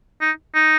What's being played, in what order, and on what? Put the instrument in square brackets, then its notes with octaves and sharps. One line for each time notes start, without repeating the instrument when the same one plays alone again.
[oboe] D#4
D#4